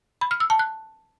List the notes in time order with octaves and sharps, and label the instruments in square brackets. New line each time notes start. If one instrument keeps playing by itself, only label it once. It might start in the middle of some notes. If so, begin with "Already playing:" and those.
[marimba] B5
F6
E6
A5
F#6